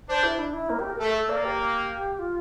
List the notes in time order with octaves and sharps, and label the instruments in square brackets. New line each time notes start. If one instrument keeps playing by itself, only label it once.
[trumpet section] D4 [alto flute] C5
[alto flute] E4
D4
E4
A#3
G4
A#4
[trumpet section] A3 [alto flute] A4
[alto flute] A4
[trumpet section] A#3 [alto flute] D5
[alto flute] G4
F4